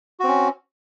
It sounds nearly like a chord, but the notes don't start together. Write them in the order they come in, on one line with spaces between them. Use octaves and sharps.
F#4 C4 C#4